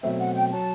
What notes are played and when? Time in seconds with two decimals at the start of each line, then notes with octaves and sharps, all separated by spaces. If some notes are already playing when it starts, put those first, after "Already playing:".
0.03 B2 F#3 A3 C4 E5
0.19 F#5
0.34 G5
0.50 F#3 A5